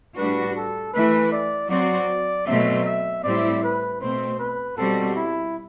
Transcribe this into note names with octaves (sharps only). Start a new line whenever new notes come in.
A2 G3 D4 F#4 B4
A4
E3 A3 E4 B4
D5
F#3 C4 F#4 D5
B2 F#3 A3 C4 E5
E5
A2 G3 C4 E4 D5
B4
B2 A3 C4 C5
B4
B2 G3 C4 F#4 A4
E4